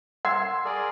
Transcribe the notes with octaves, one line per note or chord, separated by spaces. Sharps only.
F#5 C6 E6 G#6
G#4 A#4 D5